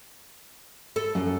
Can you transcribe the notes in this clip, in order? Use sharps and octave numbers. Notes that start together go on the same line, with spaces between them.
A4
F#2